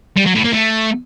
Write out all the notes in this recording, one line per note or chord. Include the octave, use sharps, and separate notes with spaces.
G3
F#3
A2
A#3
A3